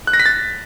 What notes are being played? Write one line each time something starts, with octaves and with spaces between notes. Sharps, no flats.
F#6
A#6
B6
A6